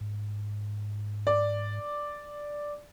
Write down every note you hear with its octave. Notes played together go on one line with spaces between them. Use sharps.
G#2
D5